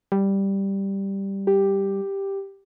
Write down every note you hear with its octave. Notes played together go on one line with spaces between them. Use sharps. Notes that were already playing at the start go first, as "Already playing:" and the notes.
G3
G4